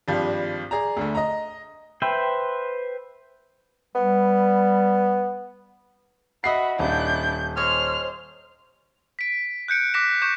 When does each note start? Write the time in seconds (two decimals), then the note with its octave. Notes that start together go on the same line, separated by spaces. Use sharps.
0.08 G#1 G2 F3 G4 D5
0.71 G#4 D5 A#5
0.97 D2 D3 A3
1.15 D#5 A#5
2.02 B4 C5 E5 G5
3.95 G3 B3
6.44 F#4 D#5 E5 F#5 B5 C7
6.79 D#1 D4 E4 G6
7.57 C5 C#5 D#5 G#5 C6 F6
9.19 B6 D7
9.68 F#6 G6 C#7 D7
9.94 D6 F#6 A#6 B6 E7
10.22 C#6 D6 G6 E7